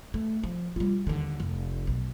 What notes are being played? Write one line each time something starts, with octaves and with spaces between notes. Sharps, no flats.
A3
F3
G3 F4
D#2 D3
F1
B1